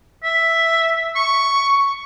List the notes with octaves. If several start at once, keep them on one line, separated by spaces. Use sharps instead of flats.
E5
C#6